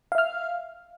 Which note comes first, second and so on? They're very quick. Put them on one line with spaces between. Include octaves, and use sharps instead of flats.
F5 E5 F6